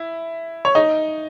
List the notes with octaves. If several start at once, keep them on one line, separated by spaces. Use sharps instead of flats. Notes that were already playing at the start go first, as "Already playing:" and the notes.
Already playing: E4
C#5
D#4 D#5